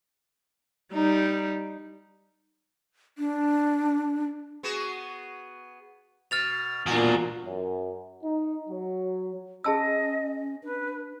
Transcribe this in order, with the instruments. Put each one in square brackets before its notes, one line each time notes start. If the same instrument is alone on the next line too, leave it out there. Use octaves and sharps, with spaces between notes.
[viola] G3 D#4
[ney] D4
[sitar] B3 F#4 G#4
[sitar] B2 [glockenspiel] F6 A6 F7
[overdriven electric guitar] E2 F#4 [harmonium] A#2 [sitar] D4 F4
[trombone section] F#2
D#4
F#3
[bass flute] C#4 [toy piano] G#4 A5 E6 [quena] D#5
[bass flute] D4 [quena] B4